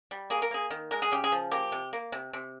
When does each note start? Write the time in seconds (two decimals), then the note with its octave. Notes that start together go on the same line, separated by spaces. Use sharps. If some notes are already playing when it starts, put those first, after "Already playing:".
0.11 G3
0.30 A#3 G#4
0.42 A#4
0.51 A#3 G#4
0.71 D#3
0.91 G#3 A#4
1.02 G#4
1.12 C#3 G4
1.24 G#4
1.32 F3
1.52 A#3 G4
1.72 C3
1.93 A#3
2.12 C3
2.33 C3